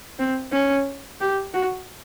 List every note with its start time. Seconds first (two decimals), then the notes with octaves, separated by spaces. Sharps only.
0.19 C4
0.52 C#4
1.21 G4
1.54 F#4